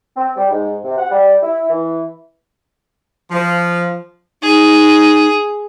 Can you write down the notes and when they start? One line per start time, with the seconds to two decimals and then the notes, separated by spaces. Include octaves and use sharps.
0.16 C4
0.36 G3
0.50 G#2
0.84 C3
0.97 F#5
1.10 G3
1.42 E4
1.70 E3
3.31 F3
4.42 D#4 G#4